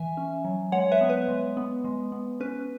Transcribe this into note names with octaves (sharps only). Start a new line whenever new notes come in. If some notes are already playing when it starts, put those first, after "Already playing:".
Already playing: E3 E5 G#5
C#4
F#3
G#3 C#5 F#5
B4 E5
B3
B4
G#3
B3
G#3
B3
C#4 B4